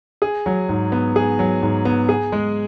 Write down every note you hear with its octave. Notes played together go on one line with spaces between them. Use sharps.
G#4
F#3
G#2
B3
G#4
F#3
G#2
B3
G#4
G#3